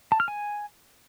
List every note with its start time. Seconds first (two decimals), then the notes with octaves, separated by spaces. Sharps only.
0.12 A5
0.20 F6
0.28 G#5